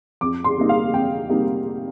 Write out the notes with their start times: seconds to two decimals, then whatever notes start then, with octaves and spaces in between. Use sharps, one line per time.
0.21 F2 D6
0.44 C6
0.57 C3 G3 A#3 D#4
0.69 F5
0.93 F2 G5
1.29 C3 G3 A#3 D#4